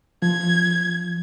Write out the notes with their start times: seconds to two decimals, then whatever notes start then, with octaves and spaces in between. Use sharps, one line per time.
0.22 F3 G#6